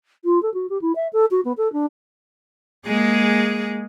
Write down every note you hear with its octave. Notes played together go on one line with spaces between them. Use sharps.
F4
A4
F#4
G4
E4
E5
A4
F#4
B3
A4
D4
G#3 A#3 G#4